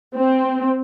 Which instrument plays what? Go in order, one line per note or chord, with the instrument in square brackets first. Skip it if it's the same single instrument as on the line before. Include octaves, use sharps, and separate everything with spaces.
[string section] C4